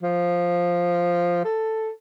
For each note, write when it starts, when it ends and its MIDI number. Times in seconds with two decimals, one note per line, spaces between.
0.03 1.43 53
1.44 1.90 69